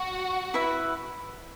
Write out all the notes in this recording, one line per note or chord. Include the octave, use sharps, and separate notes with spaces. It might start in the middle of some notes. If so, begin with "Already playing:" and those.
Already playing: F#4
E4 B4 E5 B5